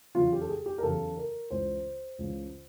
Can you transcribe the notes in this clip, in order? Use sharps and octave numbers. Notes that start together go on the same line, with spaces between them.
E2 C#3 F#3 F4
G4
A4
G#4
G4
A#4
E2 C#3 F#3 A4
A#4
C#2 C#3 E3 C5
C#2 C#3 E3